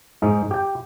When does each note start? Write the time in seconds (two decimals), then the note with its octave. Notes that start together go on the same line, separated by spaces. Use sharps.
0.22 G#2 G#3 D#4
0.51 G4 G5